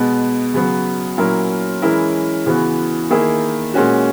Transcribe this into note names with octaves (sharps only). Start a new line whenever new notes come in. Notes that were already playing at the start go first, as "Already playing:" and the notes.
Already playing: B2 G#3 B3
C#3 F#3 B3
A#2 F#3 C#4 E4 A#4
E3 G#3 C#4 E4 A#4
C#3 E3 B3 F#4
D#3 A#3 E4 G#4
A#2 G#3 C#4 F#4